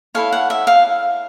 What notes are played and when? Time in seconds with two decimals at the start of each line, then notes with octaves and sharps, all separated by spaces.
0.15 E4 A4 C#5 F5
0.32 F#5
0.50 E5
0.67 F5